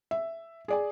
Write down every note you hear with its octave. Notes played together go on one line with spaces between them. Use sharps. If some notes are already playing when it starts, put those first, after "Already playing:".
E5
G#4 D5 G#5